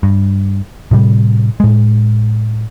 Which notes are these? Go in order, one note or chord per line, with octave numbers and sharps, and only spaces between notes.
G2
A2 C3 G3
A2 G#3